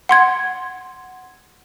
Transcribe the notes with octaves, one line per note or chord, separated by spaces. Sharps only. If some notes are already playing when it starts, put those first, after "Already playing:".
F#5 C6 G#6